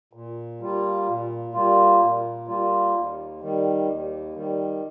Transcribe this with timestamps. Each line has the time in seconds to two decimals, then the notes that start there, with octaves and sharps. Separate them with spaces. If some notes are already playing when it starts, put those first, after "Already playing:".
0.13 A#2
0.60 G3 A#3 F4
1.07 A#2
1.54 G3 A#3 F4
2.01 A#2
2.47 G3 A#3 F4
2.94 D#2
3.41 D#3 G3
3.87 D#2
4.35 D#3 G3